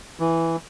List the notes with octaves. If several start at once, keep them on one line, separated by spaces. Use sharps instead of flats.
E3